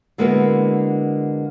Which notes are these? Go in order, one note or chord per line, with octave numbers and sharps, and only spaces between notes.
D3 G#3 A#3 B3 E4 F#4